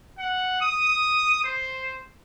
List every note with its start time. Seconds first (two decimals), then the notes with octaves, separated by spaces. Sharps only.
0.18 F#5
0.61 D#6
1.44 C5